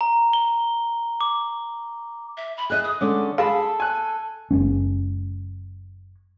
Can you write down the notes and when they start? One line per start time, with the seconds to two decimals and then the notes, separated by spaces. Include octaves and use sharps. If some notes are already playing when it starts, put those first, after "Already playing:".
0.01 A#5
0.33 G7
1.21 D6
2.37 E5
2.57 B5
2.70 G#4 D#5 E5 F#6
2.84 D#6
3.01 D3 G#3 C#4 D6
3.38 G#4 A4 F5 A5 B5
3.80 G#5 F#6
4.51 F#1 G#3 C#4